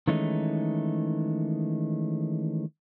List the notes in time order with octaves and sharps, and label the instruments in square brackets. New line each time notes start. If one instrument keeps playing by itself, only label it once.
[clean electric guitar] D#3 E3 G#3 A3 C#4 D#4